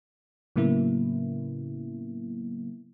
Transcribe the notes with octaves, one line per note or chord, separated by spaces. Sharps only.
A2 C#3 F#3 A#3 B3 E4